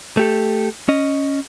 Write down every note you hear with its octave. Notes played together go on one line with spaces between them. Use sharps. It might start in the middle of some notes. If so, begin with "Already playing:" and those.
A3 G4 A4
C#4 D#5